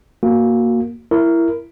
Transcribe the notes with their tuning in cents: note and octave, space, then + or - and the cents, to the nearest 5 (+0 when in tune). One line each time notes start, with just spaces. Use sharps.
A#3 +0 F#4 -10
E4 +15 A#4 +0